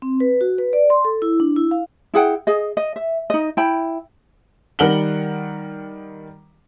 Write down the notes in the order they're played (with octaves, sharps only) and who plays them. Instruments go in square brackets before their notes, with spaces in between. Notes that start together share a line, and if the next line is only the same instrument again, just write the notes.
[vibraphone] C4
B4
F#4
B4
D5
C6
A4
E4
D4
E4
F5
[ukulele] E4 G#4 F#5 G5
G#4 D#5
D#5
E5
D#4 D#5
E4 G5 B5
[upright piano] D#3 G3 A#4 F#5 F#7 G7